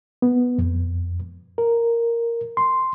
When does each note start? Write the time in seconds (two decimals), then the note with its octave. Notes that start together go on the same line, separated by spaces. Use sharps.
0.22 B3
0.59 F2
1.58 A#4
2.57 C6